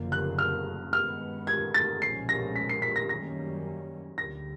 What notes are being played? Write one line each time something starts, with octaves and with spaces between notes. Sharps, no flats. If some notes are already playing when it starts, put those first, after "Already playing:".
Already playing: F#1 F#2 D3 F3 A#3
F#6
F6
G2 D#3 G#3 B3 F6
G#6
A6
B1 A#2 F3 G#3 C#4 C7
A#6
B6
C7
B6
A#6
F#2 D#3 G3 A#3 C#4 A#6
D2 D3 G3 A#6